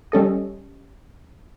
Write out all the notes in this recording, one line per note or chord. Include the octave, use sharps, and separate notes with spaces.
G3 C#4 A4 D#5